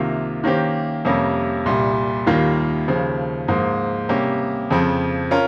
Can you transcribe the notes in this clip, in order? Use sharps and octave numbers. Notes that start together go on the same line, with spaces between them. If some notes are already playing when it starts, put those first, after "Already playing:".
Already playing: C2 C3 D#3 A#3 F4
D#3 A#3 C#4 G4 C5
F2 C3 G3 A#3 C#4
C2 A#2 G3
D#2 D#3 G3 A#3 F4
D#2 C#3 F3
G#2 F3 A#3
C3 G3 A#3 C#4 G4
F2 C#3 F3 C4
C#4 F4 A#4